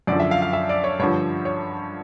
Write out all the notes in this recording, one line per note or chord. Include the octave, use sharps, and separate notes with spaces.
F#2 D3 F3 D5
E5
F5
F5
E5
D5
C#5
G2 D3 F3 C#5
C#5